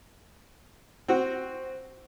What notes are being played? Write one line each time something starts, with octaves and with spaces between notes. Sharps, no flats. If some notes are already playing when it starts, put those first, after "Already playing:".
C4 F#4